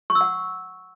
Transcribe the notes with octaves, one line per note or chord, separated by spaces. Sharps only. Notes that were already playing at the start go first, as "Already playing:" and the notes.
C#6
E6
F#5